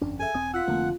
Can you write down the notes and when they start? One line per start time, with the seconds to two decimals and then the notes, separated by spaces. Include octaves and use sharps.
0.01 G1 F2 C#4 D4
0.20 G#4 A4 E5 G#5
0.34 E1 C4 D#6
0.54 F4 F#5 E6 B6
0.68 F1 D3 F3 A3 A#3 C4